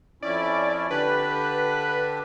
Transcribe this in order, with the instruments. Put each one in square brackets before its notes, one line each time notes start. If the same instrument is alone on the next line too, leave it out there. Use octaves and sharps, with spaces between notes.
[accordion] F2 C#4 E4 [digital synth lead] D5
[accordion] D3 D4 G4 [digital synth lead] B4